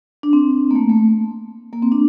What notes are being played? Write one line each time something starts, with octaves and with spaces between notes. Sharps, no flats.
D4
C4
A#3
A3
A3
A#3
C4
D4